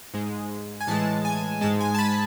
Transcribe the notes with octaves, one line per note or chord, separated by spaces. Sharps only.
G#2 G#3
G#5
A2 E3 G#3 A5
G#5
G#2 G#3 A5
G#5
A5
B5